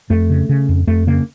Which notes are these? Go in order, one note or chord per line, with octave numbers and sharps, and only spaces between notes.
F2 A3
C#3
C#3
F2
F2 A3
C#3 A#3